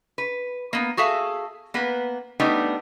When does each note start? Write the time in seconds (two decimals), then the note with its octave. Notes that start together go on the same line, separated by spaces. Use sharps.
0.18 B4
0.73 A#3 B3
0.97 F#4 G#4 A4 E5 F5
1.74 A#3 B3 B4
2.40 G3 A3 B3 D4 D#4